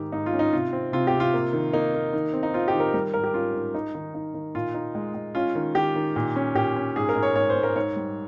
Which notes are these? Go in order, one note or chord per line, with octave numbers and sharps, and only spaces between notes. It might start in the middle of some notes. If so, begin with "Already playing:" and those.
Already playing: G#2 D#3 G4
G#2 D#4
F4
C#4
D#4
C3 F4
C4
C3 F4
G4
C3
F4
A#3
D#3
A#3 D#4
A#3
D#3
C4
D#4
C4 F4
G4
D#3
A#4
G3 A#4
G#2 A#4
G4
C#4 F4
G#2
D#4
D#3
D#4
D#3
A#2 F4
D#4
G#3
G#3
C#4 F4
D#3
D#3 G4
D#3
A#2
C#4
A#2 G4
C#4
G#2 G#4
A#4
G#2
C#5
G#2 C#5
C5
G#2
A#4
G#2 C#5
G3